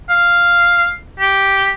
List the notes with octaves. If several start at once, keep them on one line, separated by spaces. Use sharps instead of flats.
F5
G4